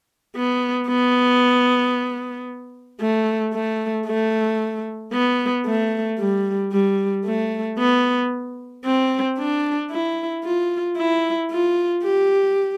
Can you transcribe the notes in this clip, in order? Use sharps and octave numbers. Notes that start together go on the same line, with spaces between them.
B3
B3
A3
A3
A3
B3
A3
G3
G3
A3
B3
C4
D4
E4
F4
E4
F4
G4